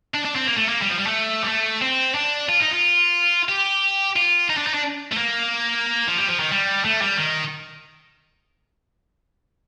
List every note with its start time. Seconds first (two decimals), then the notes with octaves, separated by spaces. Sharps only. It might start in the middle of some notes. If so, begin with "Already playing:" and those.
0.14 D4
0.25 D4
0.36 C4
0.47 A#3
0.57 A3
0.68 A#3
0.82 G3
0.89 F3
0.98 G3
1.07 A3
1.44 G3
1.49 A3
1.81 C4
2.15 D4
2.49 F4
2.60 D#4
2.71 F4
3.49 G4
4.16 F4
4.49 D#4
4.57 D4
4.67 D#4
4.74 D4
5.12 A3
5.17 A#3
6.07 F3
6.18 G3
6.28 F3
6.40 D#3
6.51 G3
6.85 A3
7.01 G3
7.17 D#3